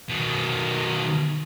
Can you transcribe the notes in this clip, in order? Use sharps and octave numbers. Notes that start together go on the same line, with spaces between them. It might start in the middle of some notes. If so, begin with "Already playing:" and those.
B2 D#3